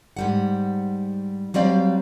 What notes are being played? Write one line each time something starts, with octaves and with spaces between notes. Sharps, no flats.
G#2 G3 F#5
F#3 G3 C4 D5 F5